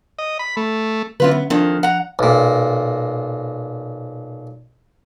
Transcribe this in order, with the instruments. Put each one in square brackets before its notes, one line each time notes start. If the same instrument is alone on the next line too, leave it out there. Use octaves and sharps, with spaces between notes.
[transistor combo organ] D#5
B5
A3
[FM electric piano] D3 F#3 C#4 [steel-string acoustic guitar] E3 F4 B4
[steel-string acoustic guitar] B3
[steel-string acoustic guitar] F2 D#3 [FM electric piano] F3 D4
[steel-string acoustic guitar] F#5 A#5
[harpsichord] B1 A#2